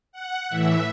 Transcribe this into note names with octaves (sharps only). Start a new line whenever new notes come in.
F#5
A2 E3 E5